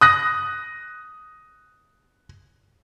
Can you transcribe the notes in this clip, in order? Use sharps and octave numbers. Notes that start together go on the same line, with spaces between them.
D#6 F#6 A#6